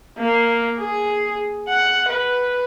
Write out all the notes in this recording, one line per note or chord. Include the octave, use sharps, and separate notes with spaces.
A#3
G#4
F#5
B4